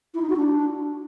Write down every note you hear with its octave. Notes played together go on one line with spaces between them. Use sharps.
E4
D#4
F#4
D4